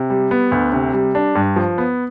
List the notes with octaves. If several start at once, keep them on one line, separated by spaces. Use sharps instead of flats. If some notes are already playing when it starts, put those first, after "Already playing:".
Already playing: C3
G3
B3
D2
C3
G3
D4
G2
F3
B3